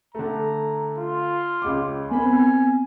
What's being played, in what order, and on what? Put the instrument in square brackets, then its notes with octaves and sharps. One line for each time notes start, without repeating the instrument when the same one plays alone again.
[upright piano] D3 A3 [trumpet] A#5
[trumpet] F4
[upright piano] C#2 G#3 D6
[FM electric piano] B3 C4 [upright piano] A#4 B5 [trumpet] G#5